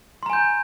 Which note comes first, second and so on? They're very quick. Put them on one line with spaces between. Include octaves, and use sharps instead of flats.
C6 A#5 G#5 G6